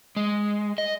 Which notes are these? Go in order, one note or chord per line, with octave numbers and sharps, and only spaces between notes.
G#3
D#5